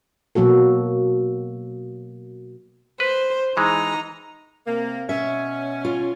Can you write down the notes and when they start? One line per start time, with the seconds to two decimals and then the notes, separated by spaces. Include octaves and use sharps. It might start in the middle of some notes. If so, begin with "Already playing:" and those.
0.35 B2 F#3 A#3 F#4 A4
3.00 B4 C5
3.57 E3 G#3 D#4 A#5
4.67 C3 A#3
5.09 B2 C#4 E5
5.85 F4